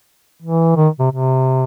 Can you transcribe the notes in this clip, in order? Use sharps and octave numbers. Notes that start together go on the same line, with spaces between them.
E3
D#3
C3
C3